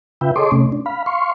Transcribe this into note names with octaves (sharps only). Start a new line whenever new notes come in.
C#3 F4 B4 E5 G5
G#4 A4 C#5 D#5 C6 D6
C3 A3 C#4
D4
F5 B5
F5 C6 C#6